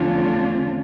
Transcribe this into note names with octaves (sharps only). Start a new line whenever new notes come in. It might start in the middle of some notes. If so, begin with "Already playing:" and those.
Already playing: E2 D3 F3 A3 C#4 D4 F4